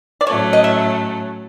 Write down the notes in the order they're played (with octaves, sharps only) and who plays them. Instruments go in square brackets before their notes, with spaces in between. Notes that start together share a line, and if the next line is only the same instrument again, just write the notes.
[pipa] D5
[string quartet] A2 F#3 A3 C#4 [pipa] C#5
[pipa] D#5
E5